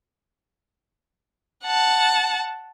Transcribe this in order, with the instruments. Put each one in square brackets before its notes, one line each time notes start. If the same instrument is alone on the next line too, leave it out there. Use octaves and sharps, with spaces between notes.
[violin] F#5 A5